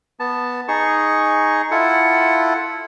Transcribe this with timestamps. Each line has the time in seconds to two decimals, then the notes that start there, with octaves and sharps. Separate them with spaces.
0.20 B3 A5
0.68 D#4 G#4 C#6
1.71 E4 F4 A4 F#5